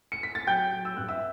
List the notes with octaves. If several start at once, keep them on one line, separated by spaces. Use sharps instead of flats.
C#7
B6
A6
F#3 G5 G6
F#3
E6
G2 F#6
E5 E6